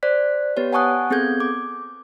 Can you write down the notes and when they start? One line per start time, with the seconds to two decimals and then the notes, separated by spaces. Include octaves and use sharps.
0.03 C5 D5 F#6 B6
0.57 B3 G4 B4 C#5
0.73 F#5 G#5 A5 C#6 D#6 F#6
1.10 B3 C4 G#4 A4 G6 G#6
1.40 D6